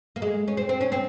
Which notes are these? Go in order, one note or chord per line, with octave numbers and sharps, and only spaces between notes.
A#3
G#3
C#4
C4
C4
C#4
C4